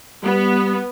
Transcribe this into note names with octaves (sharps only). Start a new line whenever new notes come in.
G3 B3